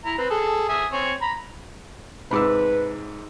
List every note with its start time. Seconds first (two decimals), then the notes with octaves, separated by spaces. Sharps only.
0.05 E4 A#5
0.18 C4 B4
0.30 G#4 A4
0.69 E5 G#5 D#6
0.92 C4 C#5 G#5
1.22 A#5 B5
2.31 G#2 C3 B4 B5 D6 E6